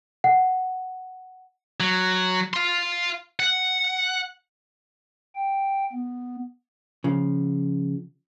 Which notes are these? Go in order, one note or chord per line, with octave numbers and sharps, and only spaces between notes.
F#5
F#3
F5 C6
F#5
G5
B3
C#3 F3